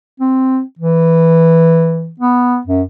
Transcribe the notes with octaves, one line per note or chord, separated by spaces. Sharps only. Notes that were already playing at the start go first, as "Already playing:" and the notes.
C4
E3
B3
F#2